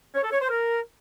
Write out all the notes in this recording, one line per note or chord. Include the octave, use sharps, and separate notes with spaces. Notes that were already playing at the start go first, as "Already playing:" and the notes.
C#5
A4
C#5
C5
A#4